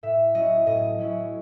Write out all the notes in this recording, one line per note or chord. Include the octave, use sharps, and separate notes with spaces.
A2 E5
F#3 C#4 E4 D#5
A2 D#5
F#3 C#4 E4